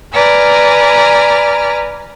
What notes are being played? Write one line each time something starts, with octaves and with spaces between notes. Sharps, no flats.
B4 D5 G#5 A#5 F6